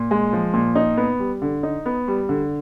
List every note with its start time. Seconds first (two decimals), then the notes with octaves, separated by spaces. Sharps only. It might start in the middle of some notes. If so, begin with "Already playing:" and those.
Already playing: A#2
0.11 G#3
0.33 F3
0.54 A#2
0.75 D#4
0.97 B3
1.19 G3
1.42 D3
1.63 D#4
1.86 B3
2.08 G3
2.29 D3